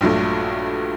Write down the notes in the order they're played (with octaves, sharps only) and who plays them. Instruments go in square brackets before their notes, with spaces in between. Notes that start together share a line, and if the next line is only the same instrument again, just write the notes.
[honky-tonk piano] A#1 G2 F#3 A3